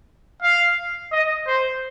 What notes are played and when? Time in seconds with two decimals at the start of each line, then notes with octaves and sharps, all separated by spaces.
0.42 F5
1.12 D#5
1.47 C5